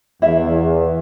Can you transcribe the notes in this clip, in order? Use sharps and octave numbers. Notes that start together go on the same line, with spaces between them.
E2 E4 E5 F5